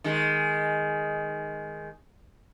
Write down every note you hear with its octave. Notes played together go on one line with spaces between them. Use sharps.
D#3 G#3